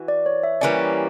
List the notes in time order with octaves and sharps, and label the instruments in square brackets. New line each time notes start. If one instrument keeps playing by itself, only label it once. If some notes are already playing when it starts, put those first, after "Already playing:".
Already playing: [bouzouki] E3 F#4
[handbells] D5
C#5
E5
[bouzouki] E3 G3 A#3 C#4 [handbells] D5